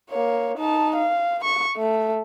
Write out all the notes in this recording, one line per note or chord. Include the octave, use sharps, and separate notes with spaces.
A#3 C#5
D#4 A5
F5
C#6
A3